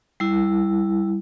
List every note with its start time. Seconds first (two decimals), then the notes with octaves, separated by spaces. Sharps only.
0.20 G3 E4